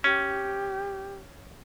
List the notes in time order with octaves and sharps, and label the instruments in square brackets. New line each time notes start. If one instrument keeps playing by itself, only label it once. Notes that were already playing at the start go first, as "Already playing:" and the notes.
[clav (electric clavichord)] C#4 [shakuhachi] G4